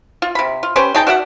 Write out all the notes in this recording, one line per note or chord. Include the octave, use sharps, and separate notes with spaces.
F4
C3 B5
F4
C#4 G4 B4 C5
D#4 G#4 G5 A5
F#4 D5 E5 F#5